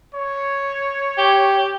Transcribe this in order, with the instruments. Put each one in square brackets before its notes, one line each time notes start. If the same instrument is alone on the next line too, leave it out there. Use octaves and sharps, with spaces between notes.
[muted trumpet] C#5
[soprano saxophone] G4